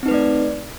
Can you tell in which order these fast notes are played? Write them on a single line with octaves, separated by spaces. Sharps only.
C4 D#4 B4 A3 D5